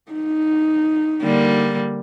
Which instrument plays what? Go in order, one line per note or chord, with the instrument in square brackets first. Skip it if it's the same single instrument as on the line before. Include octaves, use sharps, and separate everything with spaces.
[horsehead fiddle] D#4
[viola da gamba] D3 G3 A#3